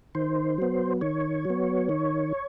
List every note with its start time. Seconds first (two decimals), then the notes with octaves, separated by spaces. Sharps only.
0.15 D#3 C5
0.58 F#3 B3
1.01 D#3 C#5
1.45 F#3
1.50 B3
1.89 D#3